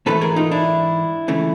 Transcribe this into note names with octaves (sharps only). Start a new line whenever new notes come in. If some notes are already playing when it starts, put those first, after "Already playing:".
G#2 E3 A3 A4 B4
G#4 A#4
D#4 F4
D4 E4
C#2 C#3 E3 A3